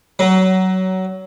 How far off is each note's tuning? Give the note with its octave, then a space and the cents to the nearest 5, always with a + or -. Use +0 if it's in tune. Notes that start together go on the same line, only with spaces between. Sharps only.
F#3 +20